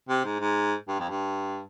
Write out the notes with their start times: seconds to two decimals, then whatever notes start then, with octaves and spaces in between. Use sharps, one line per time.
0.09 C3
0.25 G#2
0.40 G#2
0.88 G2
1.00 F2
1.10 G2